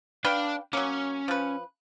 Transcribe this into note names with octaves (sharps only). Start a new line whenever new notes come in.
D4 B4 D5 F5 G5
F#3 A#3 C#4
F3 B4